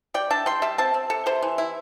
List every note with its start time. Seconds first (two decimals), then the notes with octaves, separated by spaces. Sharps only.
0.14 G3 D5 G5
0.30 D4 E5 A5
0.46 G3 G5 C6
0.62 G3 E5 A5
0.78 C4 E5 A5
0.94 C4
1.10 C3 A4
1.26 C3 G4 C5
1.42 E3
1.58 E4